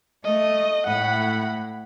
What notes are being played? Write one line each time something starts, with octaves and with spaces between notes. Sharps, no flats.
A3 D#5
A2 F#5 B5